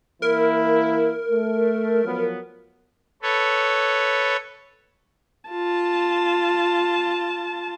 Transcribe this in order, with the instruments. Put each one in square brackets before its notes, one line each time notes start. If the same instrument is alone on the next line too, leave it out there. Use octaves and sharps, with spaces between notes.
[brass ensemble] E3 A#3 E4 [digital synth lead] A#4
[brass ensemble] A3
F3 F#3 B3
[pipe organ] A4 B4 C#5
[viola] F4 A5